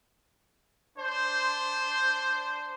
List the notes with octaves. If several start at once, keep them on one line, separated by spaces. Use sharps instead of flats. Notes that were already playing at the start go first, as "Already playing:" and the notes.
D4 C5